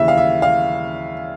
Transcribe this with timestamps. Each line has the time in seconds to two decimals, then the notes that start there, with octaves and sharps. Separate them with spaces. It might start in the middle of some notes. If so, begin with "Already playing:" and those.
Already playing: D#2 C#3 E3 E5
0.08 F5
0.17 E5
0.42 F5